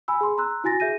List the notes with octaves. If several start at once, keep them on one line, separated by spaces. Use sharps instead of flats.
G#5 B5 E6
G#4 C6
A#5 C6 E6 F#6
E4 F#4 G#5 A6 A#6
G#4 E5 G6 A#6 D#7